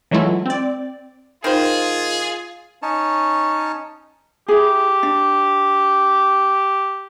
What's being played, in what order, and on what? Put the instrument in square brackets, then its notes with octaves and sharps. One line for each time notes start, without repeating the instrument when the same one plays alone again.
[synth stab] E3 F#3 G#3 A3 E4 F4
C4 D5
[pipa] D#3 C5 [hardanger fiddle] F4 [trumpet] G#4
[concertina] C#4 D#4 C#5 A5
[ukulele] E4 G#4 [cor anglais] G4
[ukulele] D4